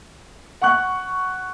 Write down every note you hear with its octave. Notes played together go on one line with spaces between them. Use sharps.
F#5 C#6 F#6